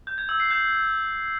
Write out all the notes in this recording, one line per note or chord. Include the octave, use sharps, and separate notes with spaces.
G6
G#6
E6
C7
G6